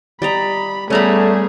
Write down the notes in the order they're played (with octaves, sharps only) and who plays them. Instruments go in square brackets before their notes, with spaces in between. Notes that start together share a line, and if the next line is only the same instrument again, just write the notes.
[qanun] G3 D#5 A#5 [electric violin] B5
[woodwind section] G3 [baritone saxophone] A3 [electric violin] B3 G#4 [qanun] C#4 A#5 B5